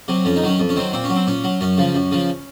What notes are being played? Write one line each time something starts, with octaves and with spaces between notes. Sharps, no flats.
C3 F#3
F2 C#4
D#4
D#3 F#3 C#4
F2
C#4
D#3 F#3 C4
A#2 C4
C#4
F#3
C4
A#2 C#4
F#3
F#2 C#4
C#3 F3
F#2
C#3 F3